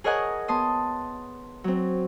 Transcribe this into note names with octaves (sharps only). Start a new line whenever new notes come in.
G#4 A#4 C#5 D#5 F#5 G#5
B3 A5 C6 D#6
F#3 C4